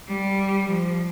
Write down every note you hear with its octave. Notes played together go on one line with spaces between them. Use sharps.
G3
F3